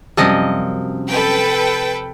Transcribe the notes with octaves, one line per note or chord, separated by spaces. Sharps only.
F#2 C3 F3 G3 D#5
A4 B4 G5